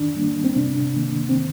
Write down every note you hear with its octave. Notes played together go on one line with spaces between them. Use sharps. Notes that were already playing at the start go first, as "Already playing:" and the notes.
Already playing: D#3 D4
G3 A#3
C4
C3 D4
D#3 A#3
C4
D#3